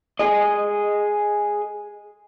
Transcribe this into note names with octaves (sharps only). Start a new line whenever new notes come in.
G#4 D#5